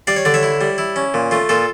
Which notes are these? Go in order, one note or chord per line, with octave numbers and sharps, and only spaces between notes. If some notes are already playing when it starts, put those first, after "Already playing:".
G3 D5 F5
C#5
D3 D5
C#5 E5
E4
G3
E4
C#4
A#2
A3 F4
A#2 F4 A4